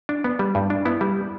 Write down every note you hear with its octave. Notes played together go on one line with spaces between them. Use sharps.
D4
B3
G3
G2
D4
B3 E4
G3